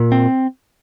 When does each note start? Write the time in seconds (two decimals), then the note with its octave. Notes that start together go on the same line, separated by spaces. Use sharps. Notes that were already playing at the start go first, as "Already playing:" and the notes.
Already playing: A#2
0.12 C4